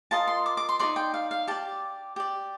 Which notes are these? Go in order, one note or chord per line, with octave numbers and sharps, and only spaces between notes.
F4 A#4 D#5 A5
C6
D6
D6
C6
D#4 A#4 D5 C6
G5
F5
F5
G4 D5 A5
G4 D5